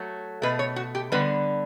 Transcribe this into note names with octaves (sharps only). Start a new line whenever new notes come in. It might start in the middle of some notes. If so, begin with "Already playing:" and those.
Already playing: F#3 A3
B2 A3 B4
C#5
F#4
G4
D3 G3 B3 B4